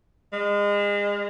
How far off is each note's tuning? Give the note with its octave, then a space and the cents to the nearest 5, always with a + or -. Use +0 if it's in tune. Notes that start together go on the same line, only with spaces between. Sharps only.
G#3 -30